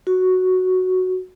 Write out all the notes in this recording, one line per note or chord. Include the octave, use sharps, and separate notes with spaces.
F#4